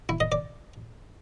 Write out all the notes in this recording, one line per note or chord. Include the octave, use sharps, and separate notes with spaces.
E4
D#5
D5